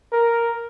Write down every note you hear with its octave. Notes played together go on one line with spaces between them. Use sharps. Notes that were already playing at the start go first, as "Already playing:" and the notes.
A#4